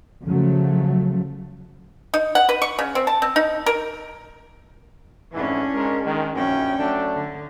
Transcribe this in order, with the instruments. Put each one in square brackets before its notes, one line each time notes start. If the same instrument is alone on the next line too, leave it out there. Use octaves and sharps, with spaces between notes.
[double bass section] C#3 F3 F#3 A3
[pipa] D#4
F#5
B4
C#6
C#3
C4
A5
C4
D#4
A#4
[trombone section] F2 G#2 E3 [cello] C#4 D4
[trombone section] G#2 G#3 A#4
D#3 G#3
[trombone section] A#1 F#2 [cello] C#4 G5
[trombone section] F#3 A3 D4
[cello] D3